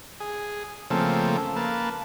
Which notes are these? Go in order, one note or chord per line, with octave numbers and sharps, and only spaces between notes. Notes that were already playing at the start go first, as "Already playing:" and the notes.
G#4
C#3 F3 A3 A#3 C4 A4
A#3 B4 A5